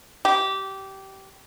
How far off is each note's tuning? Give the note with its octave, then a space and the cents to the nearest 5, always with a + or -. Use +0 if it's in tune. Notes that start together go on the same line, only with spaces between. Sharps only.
G4 -20